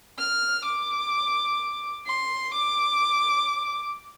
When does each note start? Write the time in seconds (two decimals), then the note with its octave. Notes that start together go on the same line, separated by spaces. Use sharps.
0.18 F6
0.65 D6
2.06 C6
2.54 D6